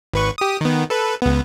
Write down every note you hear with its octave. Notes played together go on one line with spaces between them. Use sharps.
G#1 B4 C#6
G4 D#6
D#3 B3
A4 B4
C#2 B3